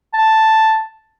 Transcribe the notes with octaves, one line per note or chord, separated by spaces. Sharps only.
A5